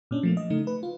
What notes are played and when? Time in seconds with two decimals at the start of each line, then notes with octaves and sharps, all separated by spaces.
0.11 A#2 C#4 D4
0.23 F3 A3 A#3
0.37 D#5
0.50 C#3 A3 D#4
0.67 B4
0.83 F4